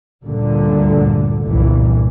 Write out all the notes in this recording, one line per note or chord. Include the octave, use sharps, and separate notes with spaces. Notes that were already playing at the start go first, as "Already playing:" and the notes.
D2 G2 A#2 D3
G1 C2 G2 A#2 E3